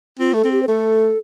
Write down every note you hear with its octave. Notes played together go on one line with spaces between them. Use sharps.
C4 F4
A3 A4
C4
G4
C5
A3 A4